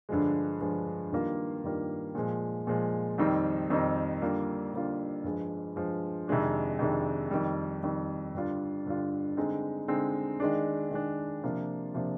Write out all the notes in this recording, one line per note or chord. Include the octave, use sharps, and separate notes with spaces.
G2 D3 F3 G#3
G2 D3 F3 G#3
G2 D#3 G3 A#3 F4
G2 D#3 G3 A#3 F4
A#2 F3 G#3
A#2 F3 G#3
F2 D#3 G3 C4 D#4
F2 D#3 G3 C4 D#4
D3 G3 A#3 D4 F4
D3 G3 A#3 D4 F4
G2 F3 G#3
G2 F3 G#3
F2 C3 D#3 G#3 D4
F2 C3 D#3 G#3 D4
F2 D#3 G3
F2 D#3 G3
G2 D3 G3 D4 F4
G2 D3 G3 D4 F4
D3 G#3 C4 D#4
D3 G#3 C4 D#4
D#3 G#3 D4
D#3 G#3 D4
C3 F3 A#3 D4 F4
C3 F3 A#3 D4 F4